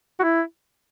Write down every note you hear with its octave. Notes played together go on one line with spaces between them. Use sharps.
F#4
E4